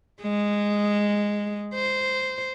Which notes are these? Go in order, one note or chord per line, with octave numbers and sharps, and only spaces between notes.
G#3
C5